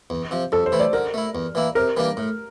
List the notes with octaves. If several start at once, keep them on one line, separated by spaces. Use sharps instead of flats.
E2
C3 F3
F2 A4
C5
E3 A3 E4
D5
D3 A#4
A3 E4
E2
E3 A#3 E4
C3 A#4
E3 G3 A#3 D4
A2